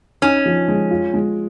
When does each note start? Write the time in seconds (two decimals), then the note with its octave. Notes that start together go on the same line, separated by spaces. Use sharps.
0.22 C#4 D#4
0.46 F3
0.68 G#3
0.91 F4
1.14 G#3